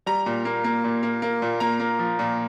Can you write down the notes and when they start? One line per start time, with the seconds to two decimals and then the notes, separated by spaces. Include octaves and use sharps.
0.06 G3 A#5
0.26 A#2
0.45 A#3
0.64 A#3
0.84 A#2
1.03 A#3
1.22 A#3
1.42 A#2
1.60 A#3 A#5
1.80 A#3
1.99 F3
2.19 A#2